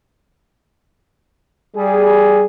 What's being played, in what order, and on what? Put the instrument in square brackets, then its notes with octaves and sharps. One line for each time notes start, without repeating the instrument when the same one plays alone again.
[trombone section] G3 G#4